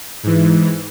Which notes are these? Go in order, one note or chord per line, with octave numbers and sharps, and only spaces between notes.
G#2 E3